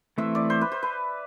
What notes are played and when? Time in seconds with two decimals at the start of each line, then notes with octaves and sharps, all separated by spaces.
0.18 E3 A3 C4 E5
0.35 D5
0.50 C5
0.61 B4
0.72 C5
0.83 B4